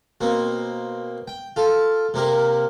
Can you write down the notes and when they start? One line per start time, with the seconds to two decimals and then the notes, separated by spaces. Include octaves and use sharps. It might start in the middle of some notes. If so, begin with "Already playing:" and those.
0.21 B2 A#3 C4
1.28 G5
1.56 F4 A4
2.14 C3 A#3 G4 A#4